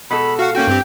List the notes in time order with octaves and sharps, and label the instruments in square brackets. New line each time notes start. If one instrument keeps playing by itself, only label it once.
[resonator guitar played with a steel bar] B2 G#3 A4 [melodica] B5
[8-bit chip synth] F#4 F#5 [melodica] F5
[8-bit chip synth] A#3 C#4 F#4 [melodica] G5
[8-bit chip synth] G2 C4 G4